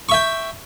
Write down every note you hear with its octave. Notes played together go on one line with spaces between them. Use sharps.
E5 G5 C#6